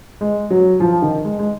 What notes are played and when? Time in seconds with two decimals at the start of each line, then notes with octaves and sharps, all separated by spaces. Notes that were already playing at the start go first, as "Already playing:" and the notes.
0.21 G#3
0.50 F#3
0.80 F3
1.02 D#3
1.24 G#3
1.39 G#3